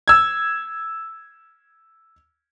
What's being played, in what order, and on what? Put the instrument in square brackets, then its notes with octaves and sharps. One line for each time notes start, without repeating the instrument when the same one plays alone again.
[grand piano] E6 G#6